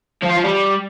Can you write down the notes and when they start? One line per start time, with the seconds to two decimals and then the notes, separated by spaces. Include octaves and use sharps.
0.23 F3
0.30 F4
0.37 F3
0.44 G3